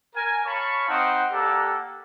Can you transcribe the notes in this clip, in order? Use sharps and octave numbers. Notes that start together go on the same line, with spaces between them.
A#4 G#5
C#5 F5 A5 B5 C#6
C4 D#4 D#5 F#5
A#3 G4 A4 D5 F#5 A#5